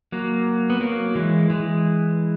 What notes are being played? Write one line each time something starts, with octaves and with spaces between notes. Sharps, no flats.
F#3 A#3
B3
F#3 A#3
E3 G#3
E3 G#3